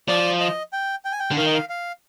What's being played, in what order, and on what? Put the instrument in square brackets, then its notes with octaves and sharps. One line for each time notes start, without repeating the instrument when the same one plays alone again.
[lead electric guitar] F3 [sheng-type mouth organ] D5
[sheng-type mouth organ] D#5
G5
G5
G#5
G5
[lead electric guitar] D3
[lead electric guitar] D#3 [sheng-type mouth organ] F5
[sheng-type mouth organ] D#5
F5
F5